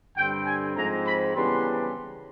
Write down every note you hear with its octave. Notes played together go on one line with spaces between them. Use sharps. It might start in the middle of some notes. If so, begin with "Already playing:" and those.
G2 D3 G3 C4 G5
G#5
G#2 F3 G#3 C4 A#5
B5
C#3 E3 G3 B3 D4 C6